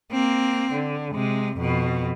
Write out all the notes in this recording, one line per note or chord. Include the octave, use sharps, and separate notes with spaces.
A#3 C4
D3
C3 G#3
F2 B2